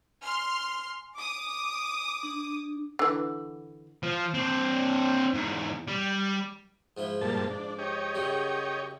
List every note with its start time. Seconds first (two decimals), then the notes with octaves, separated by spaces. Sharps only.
0.23 G#5 C6 F6
1.16 D6 D#6
2.23 D4
2.99 D3 E3
4.03 F3
4.34 C4 D4
5.33 E2 G#2
5.88 G3
6.97 G#2 F3 E4
7.21 G2 A#2 A5
7.50 D4
7.79 G4 C#5 D#5
8.15 F#2 C#3 G3